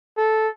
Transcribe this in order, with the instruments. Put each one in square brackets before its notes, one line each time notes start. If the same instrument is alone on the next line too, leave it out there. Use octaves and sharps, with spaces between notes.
[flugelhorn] A4